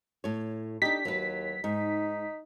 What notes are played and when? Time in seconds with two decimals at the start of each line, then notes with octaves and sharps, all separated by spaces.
0.24 A2 C#5
0.82 D4 D#4 G4 B6
1.05 D#2 F#3 B4
1.64 G#2 D#4